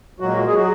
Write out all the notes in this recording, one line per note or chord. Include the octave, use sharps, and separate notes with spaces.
A#2 F#3 G#3 F#4
G#4
F#3 F#4